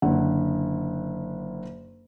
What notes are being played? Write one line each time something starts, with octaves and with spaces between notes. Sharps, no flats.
F#1 D3 F#5